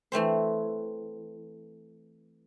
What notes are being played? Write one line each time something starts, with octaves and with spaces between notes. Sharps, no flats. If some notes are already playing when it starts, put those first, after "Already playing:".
E3 A3 C4 C5